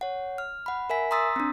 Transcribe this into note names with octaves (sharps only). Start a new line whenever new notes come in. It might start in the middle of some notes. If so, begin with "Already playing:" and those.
C#5 F#5
F6
F#5 B5
A#4 E5 G#5 B6
A#5 C6 D#6 E6 A6 B6
C4 D4